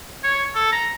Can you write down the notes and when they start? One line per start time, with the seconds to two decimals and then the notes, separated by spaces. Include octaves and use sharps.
0.24 C#5
0.55 A4
0.72 A#5